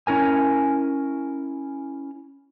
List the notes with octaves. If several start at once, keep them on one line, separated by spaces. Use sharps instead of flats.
C#4 E4 A#4 G#5